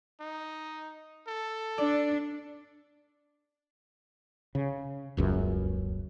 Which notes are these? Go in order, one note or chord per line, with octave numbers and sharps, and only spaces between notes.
D#4
A4
D4 D5
C#3
D#1 C#2 F#2